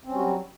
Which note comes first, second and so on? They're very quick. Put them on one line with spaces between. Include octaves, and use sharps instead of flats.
C4 C#4 G3 F#4 F#3